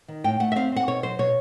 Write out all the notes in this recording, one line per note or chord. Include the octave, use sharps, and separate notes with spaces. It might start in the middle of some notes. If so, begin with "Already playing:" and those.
D#3
A2 G5
A3 F#5
E5
C4 F5
C4 F#5
B2 C#5
F#3 C5
B2 C#5